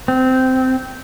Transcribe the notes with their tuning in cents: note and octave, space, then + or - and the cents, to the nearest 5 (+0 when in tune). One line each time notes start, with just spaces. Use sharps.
C4 -15